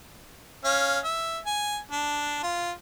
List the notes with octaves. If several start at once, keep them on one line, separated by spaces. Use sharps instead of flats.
C#4 F5
E5
G#5
D4
F4